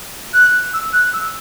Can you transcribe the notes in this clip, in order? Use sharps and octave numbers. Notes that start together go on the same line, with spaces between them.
F#6
E6
F#6
E6